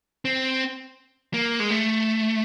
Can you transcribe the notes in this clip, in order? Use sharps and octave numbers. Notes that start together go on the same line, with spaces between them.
C4
A#3
G#3
A3